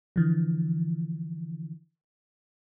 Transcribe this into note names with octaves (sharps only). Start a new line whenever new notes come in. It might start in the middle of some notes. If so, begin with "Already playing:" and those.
D3 E3 F3